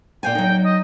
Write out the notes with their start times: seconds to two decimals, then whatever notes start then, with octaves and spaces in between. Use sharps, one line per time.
0.23 A#2 F5 G5 G#5
0.35 F#3 D#4
0.64 D#5